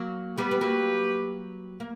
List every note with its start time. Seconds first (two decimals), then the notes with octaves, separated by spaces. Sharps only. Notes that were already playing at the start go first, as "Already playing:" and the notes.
Already playing: F#3 A#3
0.38 G3 B3 G4 B4
0.51 B3
0.61 F#3 A#3
1.80 A#3